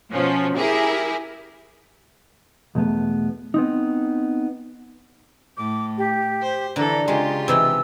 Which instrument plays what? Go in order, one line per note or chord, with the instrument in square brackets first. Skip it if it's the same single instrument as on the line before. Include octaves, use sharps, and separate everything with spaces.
[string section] B2 F3 C#4
E4 G4 G#4 A#4
[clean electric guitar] B1 E2 A3 B3
B3 C4 D#4
[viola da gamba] A2 [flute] D6
[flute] G4
[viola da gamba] C5
[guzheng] D3 [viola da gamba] E3 A4 [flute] A#5
[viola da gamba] C#3 F4 G4 [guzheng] G#3
[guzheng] C3 E3 D#4 [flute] E6